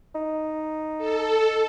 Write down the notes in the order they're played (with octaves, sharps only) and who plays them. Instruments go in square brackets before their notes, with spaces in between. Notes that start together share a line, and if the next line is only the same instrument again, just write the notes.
[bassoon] D#4
[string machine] A4